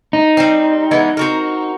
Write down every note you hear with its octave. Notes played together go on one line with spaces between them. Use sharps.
D#4
G3 C4
E3 G#3 B3
C4 F#4 A#4